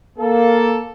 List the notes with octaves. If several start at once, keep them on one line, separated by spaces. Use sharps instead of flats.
A#3 A4